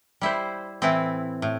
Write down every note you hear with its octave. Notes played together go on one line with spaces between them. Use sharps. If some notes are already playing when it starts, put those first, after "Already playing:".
G3 E4 C5
A2 E3 C4 E4
A2